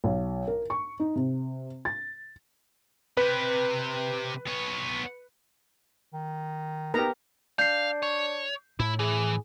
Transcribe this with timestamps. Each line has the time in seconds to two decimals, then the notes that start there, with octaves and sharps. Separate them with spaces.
0.04 B1
0.47 A#4
0.70 C#6
1.00 D#4
1.16 C3
1.85 A6
3.17 C3 G4 B4
4.47 B3 C#5
6.13 D#3
6.94 B3 D#4 G4 A#4 A#5
7.59 D4 F5 G6 C7
8.02 C#5
8.80 A2 E4
8.99 E3 G#4